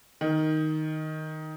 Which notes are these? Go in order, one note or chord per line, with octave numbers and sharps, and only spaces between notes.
D#3